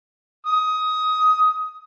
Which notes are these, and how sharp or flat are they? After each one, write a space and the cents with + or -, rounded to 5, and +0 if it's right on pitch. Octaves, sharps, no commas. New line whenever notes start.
D#6 +15